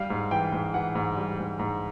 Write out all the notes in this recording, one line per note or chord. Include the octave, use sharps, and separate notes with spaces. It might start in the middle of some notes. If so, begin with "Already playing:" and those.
Already playing: G3 F5
G#2
E3 G5
G#2
E3 F#5
G#2
G3
G#2
G#2